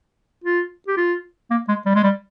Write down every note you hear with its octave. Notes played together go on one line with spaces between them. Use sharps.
F4
G4
F4
A#3
G#3
G3
G#3
G3